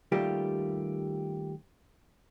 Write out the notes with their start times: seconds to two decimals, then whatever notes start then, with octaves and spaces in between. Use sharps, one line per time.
0.12 D#3 G3 A3 A#3 F4 G4